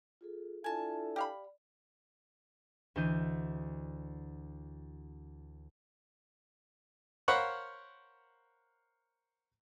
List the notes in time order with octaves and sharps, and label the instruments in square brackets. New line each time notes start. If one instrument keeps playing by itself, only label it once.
[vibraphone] F4 G#4 A4
[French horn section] D4 E4 A4 [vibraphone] F4 [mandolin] G#5 A5
[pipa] G4 F5 B5 [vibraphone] D5
[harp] D2 E3 D4 D#5 G6 D#7
[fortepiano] A#4 C5 C#5 F5 F#5 B5